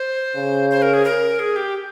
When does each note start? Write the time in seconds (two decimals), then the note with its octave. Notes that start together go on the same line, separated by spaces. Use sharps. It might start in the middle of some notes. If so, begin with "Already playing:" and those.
Already playing: C5
0.36 C#3
0.71 C5
0.82 A#4
0.94 G#4
1.05 A#4
1.39 G#4
1.56 G4